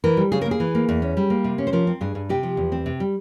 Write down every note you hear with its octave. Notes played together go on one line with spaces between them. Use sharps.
E3 A#4
G3
C#3 G#4
A#3 A#4
G#4
E3
A#3
E2
C#4
G3
A#3
C3
C#4
C5
F3 A#4
C4
G2 G#4
G2
C3 G4
F3
E2
C4
C3
G3